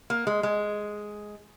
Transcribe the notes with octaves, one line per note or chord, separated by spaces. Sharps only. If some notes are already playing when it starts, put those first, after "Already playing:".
A#3
G#3
G#3